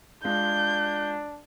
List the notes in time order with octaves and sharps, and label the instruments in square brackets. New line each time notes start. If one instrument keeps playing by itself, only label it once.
[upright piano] G#3 F4 [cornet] D4 [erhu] G6